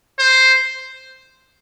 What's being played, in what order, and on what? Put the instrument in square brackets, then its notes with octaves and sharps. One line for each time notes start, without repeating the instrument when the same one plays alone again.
[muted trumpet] C5